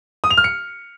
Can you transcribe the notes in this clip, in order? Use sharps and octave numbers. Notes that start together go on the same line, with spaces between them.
D#6
F7
F6
C#7